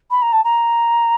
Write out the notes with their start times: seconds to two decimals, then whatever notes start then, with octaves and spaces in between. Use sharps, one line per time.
0.10 B5
0.22 A#5
0.32 A5
0.44 A#5